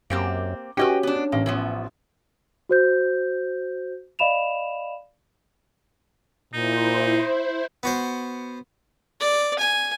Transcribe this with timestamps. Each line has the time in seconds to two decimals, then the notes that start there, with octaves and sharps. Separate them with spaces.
0.10 F#2 A#3 C4 G4
0.77 C#4 F#4 G4 B4 D#5 G5
1.03 B3 D4
1.32 A1 A#3
1.46 E3 F3 B3
2.69 F#4 C5 G6
4.19 D5 D#5 F5 B5 E7 F7
6.53 A#2 D#4 E4 C5
7.83 B3 F#4 C5
9.20 D5
9.59 G#5